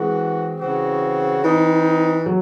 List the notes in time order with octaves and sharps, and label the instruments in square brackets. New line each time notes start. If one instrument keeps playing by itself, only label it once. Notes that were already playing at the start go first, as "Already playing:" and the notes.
Already playing: [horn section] E3 C4 F#4 [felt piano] G#3
[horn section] C#3 E3 C4 F#4
E3 C4 D#4
[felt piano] F#3